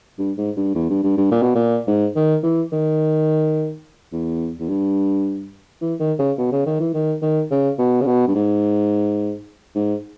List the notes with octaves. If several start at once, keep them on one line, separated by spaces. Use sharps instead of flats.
G2
G#2
G2
E2
G2
G2
G2
A#2
B2
A#2
G#2
D#3
E3
D#3
E2
E2
G2
E3
D#3
C#3
B2
C#3
D#3
E3
D#3
D#3
C#3
B2
C#3
B2
G2
G#2
G#2